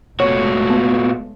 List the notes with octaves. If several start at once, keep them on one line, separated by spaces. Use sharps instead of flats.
F1 A#2 G#3 A3 F#4 C#5
B3 A5